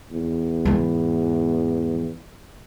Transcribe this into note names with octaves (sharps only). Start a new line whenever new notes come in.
E2
G#2 E3